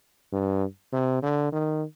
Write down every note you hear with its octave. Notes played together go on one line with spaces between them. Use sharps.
G2
C3
D3
D#3